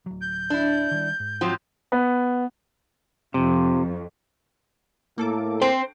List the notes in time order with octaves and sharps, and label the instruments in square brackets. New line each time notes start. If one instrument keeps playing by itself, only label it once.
[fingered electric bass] D1 F#3
[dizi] G6
[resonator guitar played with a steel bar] D4 E4
[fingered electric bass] D#3 G3
G#2
[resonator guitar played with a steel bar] F3 F#3 C4
[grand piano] B3
[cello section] F2 [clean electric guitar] C3
[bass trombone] A2 [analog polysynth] A#3 A4 D6
[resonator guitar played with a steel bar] C4 [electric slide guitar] C5